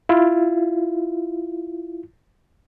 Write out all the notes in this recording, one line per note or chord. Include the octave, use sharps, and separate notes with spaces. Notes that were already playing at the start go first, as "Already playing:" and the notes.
E4 F4